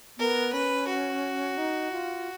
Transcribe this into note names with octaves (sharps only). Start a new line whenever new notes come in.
B3 A#4
C#4 B4
F#4
D#4
F4